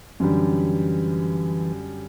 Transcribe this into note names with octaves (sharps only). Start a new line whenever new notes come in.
F#2 D3 E3 G3